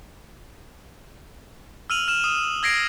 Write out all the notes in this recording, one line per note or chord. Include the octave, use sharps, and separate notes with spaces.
E6 F6 D#7 F7 F#7
F6 E7
D#6
E6 G#6 A#6 C7 D7